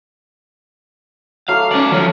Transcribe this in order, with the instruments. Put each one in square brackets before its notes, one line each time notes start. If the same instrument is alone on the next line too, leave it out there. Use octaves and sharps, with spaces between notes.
[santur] F#3 A3 D6 [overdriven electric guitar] F5
[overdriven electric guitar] C#4 D5
F3 C#4